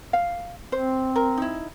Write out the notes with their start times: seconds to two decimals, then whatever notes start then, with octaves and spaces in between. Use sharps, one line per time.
0.13 F5
0.72 C4 C5
1.16 A#4
1.37 D#4 E4